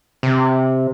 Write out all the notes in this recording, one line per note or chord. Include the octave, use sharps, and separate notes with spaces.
C3